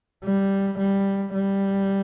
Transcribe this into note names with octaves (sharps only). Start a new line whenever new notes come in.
G3
G3
G3